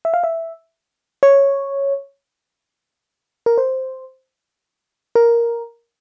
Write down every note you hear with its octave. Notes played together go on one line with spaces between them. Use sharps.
E5
F5
E5
C#5
A#4
C5
A#4